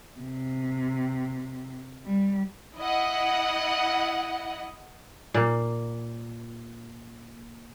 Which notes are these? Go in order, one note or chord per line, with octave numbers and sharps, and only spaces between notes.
C3
G3
E4 D#5 F#5
A#2 A#3